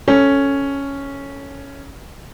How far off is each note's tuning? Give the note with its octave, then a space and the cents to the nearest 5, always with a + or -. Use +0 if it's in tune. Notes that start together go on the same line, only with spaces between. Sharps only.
C#4 +0 A4 +0